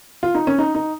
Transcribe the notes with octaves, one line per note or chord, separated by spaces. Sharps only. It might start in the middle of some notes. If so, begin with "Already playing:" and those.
F4
D#4
C#4
D#4
D#4